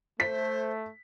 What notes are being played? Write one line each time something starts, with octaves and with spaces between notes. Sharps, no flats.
A3 C5 B6